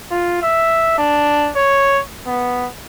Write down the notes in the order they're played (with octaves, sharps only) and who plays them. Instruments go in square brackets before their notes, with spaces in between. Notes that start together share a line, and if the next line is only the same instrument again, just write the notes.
[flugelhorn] F4
E5
D4
C#5
B3